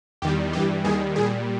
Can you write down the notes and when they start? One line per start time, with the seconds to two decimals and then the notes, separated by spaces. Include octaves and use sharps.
0.22 E2 D#3 G3 G4
0.53 G2 E3 G3 G4
0.84 D#2 D#3 G3 G#4
1.16 A#2 G3 G#4